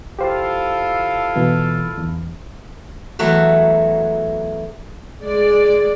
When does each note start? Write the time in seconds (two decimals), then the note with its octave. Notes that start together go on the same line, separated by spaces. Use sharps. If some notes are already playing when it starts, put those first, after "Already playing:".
0.19 E4 F4 G4 A4 C5 F5
1.36 B2 E3
1.98 E2
3.19 E2 F#3 A3 F#4
5.23 G#3 D5